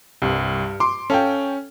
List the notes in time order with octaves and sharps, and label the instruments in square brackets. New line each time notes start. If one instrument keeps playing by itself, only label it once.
[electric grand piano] C2 [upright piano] G2
[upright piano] C6 [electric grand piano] D6
[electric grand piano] C#4 [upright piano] A4 F5 G5